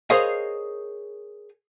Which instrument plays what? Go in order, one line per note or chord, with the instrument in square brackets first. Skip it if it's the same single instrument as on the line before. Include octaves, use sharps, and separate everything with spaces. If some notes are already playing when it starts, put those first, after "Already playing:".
[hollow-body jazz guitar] G#4 A#4 C5 C#5 D#5 F5